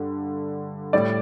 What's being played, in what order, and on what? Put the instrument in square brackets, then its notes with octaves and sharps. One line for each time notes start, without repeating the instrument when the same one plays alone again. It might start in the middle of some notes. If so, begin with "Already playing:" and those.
Already playing: [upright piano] G2 D3 G3
A2 G3 D5